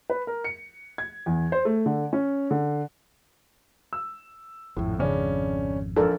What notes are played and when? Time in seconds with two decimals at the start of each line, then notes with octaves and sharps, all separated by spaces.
0.10 B4
0.27 A#4
0.44 C#7
0.98 G#6
1.26 E2
1.52 C5
1.65 A3
1.86 D3
2.13 C#4
2.51 D3
3.93 E6
4.77 G#1 F2 A2
4.99 C#3 C#4 D4
5.97 A#1 A4 A#4 D5